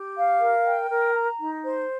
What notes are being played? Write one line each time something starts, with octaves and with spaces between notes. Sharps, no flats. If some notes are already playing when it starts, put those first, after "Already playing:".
Already playing: G4
F5
A#4
G5
A#4
A#5
D#4
C5